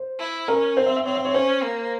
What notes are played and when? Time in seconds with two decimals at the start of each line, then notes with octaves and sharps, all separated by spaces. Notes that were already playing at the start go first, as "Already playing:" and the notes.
Already playing: C5
0.19 E4
0.48 C#4 A#4
0.77 C4 C5
0.86 E5
0.96 E5
1.05 C4 C#5
1.15 E5
1.25 C#5
1.34 C#4 C5
1.63 A#3